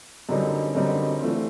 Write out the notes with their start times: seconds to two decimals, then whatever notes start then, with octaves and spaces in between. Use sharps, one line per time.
0.29 F#2 D3 G3 C4 D#4
0.75 F#2 D3 G3 C4 D#4
1.20 E3 A3 C4 F4